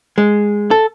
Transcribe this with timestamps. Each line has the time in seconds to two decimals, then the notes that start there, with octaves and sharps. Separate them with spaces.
0.18 G#3
0.71 A4